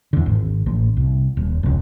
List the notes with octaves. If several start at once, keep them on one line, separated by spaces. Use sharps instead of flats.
E2 D3
G#1
A1
C2
D#1
E1 C#2